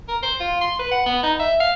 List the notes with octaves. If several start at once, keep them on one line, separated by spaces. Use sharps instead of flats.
A#4
C5
F4
C6
B4
F#5
B3
D#4
E5
F5